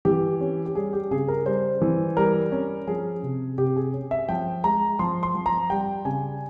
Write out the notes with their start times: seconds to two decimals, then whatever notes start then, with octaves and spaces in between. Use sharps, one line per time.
0.05 E3 G4
0.40 C#4
0.66 G4
0.75 G3 G#4
0.93 G4
1.11 C#3 G#4
1.28 A#4
1.46 G3 C5
1.81 E3
2.17 G3 A#4
2.52 C#4
2.87 F3 G#4
3.23 C3
3.58 C3 G4
3.76 G#4
3.93 C#4
4.11 E5
4.28 F3 G5
4.64 G#3 A#5
4.99 F3 C6
5.23 C6
5.34 F3
5.46 A#5
5.70 G3 G5
6.05 C#3 G#5